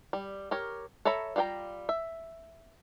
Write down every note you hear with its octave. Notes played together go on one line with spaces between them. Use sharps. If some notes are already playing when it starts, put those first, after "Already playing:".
G3
G4 A#4 C#5
A4 C#5 E5 A#5 B5
G3 F4 F#5 G5 A#5
E5